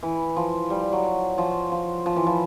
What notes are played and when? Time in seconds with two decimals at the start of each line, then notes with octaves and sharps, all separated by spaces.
0.03 E3
0.36 F3
0.70 G3
0.92 F#3
1.38 F3
1.72 F3
2.06 F3
2.16 E3
2.27 F3